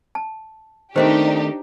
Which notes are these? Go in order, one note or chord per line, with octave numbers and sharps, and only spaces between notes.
A5
D#3 A3 C4 D4 D#4 G4 C5